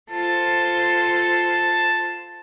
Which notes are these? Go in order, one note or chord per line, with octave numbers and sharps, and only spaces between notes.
F4 A4 C5 A5